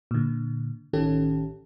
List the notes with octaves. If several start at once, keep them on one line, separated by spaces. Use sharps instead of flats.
A#2 D3
A1 D#3 C#4 G4 A4